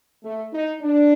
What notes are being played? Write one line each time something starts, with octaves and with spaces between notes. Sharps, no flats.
A3
D#4
D4